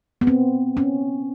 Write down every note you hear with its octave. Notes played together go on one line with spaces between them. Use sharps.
B3
C4
C#4